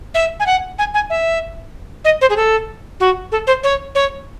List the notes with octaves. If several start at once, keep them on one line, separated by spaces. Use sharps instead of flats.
E5
G#5
F#5
G#5
G#5
E5
D#5
C5
G#4
A4
F#4
A4
C5
C#5
C#5